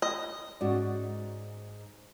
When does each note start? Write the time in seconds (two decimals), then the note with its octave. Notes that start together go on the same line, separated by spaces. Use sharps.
0.02 D#5
0.61 G#2 C#4 F#4 D5